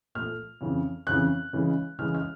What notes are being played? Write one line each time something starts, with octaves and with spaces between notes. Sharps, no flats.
A#2 F3 A3 F6
F2 C#3 E3
F2 C#3 E3 F#6
C#3 E3 G#3
C#3 E3 G#3 F6
F6